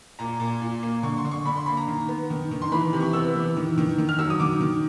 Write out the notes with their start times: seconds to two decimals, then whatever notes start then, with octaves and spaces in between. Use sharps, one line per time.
0.19 A#2 A#5
0.40 A#2
0.62 A#2
0.83 A#3
1.03 D3 C#6
1.18 C6
1.25 D3
1.32 C#6
1.45 D3 B5
1.57 C6
1.66 A#3 B5
1.77 A#5
1.88 D#3
2.08 B3
2.30 D#3
2.51 D#3
2.62 C6
2.72 E3 B5
2.93 C3
3.00 C#6
3.13 B3 E6
3.35 E3
3.57 D#3
3.78 D#3
3.98 D#3
4.09 F6
4.19 F#3 E6
4.30 D#6
4.40 D#3 D6
4.61 D#3